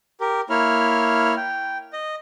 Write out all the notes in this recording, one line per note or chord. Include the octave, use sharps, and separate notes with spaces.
G4 A#4
A#3 E4 C#5 F6
G5
D#5